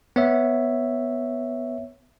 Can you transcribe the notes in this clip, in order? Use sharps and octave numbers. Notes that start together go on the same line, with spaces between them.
B3 C#5 E5